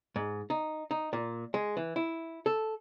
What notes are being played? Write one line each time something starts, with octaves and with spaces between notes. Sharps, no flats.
G#2
D#4
D#4
A#2
G#3
E3
E4
A4